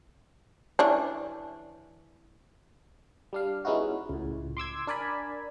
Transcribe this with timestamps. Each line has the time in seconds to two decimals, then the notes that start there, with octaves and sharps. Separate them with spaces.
0.79 E3 C#4 D4
3.33 G3 D4 F5
3.65 G#3 B3 C#4 D#4 E4 F#4
4.09 C#2 A2
4.57 C6 D6 E6 G#6
4.87 D4 A#4 D5 G#5 B5